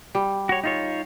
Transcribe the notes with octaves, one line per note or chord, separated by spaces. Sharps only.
G3
F#4 C#5
D#4 F4 C#5